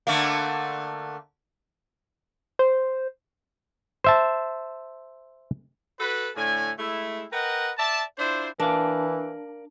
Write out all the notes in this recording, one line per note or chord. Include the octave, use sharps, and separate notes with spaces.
D3 A3 A#3
C5
C5 E5 A5
F#4 A4 B4
A2 D3 A3 G#5
G#3 A3 E4
A#4 B4 D#5 F#5 G5
D5 E5 A5
D4 E4 F4 C5
E3 D4 A#4 D5 F5